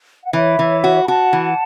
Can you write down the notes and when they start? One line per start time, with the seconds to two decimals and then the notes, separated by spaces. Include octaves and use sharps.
0.24 F#5
0.33 E3 C#5 E5
0.59 E3
0.84 F#4
1.04 B5
1.08 F#4 F#5 A5
1.33 E3